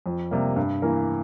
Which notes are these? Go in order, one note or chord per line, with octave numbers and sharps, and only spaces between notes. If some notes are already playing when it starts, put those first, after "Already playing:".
F2
C3 G3 A#3
G2
E3 A#3 E4 A#4